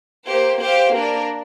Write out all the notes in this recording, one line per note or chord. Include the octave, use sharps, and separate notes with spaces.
A#3 G4 C5
G4 C5 F5
A#3 D4 A#4